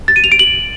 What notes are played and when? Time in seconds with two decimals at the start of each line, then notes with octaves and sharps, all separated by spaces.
0.08 A6
0.16 D#7
0.24 F7
0.32 D7
0.39 F#7